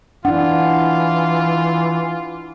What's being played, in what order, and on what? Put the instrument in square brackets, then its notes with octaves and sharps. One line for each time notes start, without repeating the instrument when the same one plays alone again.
[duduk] E3 [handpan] D4 E4 [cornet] F4 [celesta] F#5